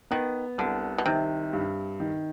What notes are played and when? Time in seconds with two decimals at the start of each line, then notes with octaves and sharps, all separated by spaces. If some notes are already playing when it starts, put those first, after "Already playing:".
0.11 D#3 B3
0.58 C2 D3
0.98 B2
1.06 C3 D#3
1.53 G2
2.00 D#3